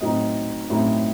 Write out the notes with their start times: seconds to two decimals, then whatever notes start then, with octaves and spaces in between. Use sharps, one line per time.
0.01 A2 F#3 C4 D#4 D#5
0.70 A2 F#3 C4 D#4